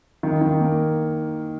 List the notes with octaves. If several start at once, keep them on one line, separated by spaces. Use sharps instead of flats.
D#3
D#3
A#3